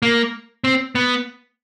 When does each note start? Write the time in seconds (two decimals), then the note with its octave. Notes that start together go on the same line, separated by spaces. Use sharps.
0.02 A#3
0.64 C4
0.95 B3